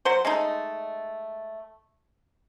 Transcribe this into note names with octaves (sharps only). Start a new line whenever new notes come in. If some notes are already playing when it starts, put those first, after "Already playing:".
F#3 C5
G#3 A3 D#4